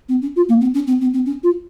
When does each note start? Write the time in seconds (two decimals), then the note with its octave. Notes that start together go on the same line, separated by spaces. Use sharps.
0.08 C4
0.22 C#4
0.35 F4
0.48 A#3
0.60 C4
0.74 C#4
0.87 C4
1.01 C4
1.13 C4
1.25 C#4
1.43 F4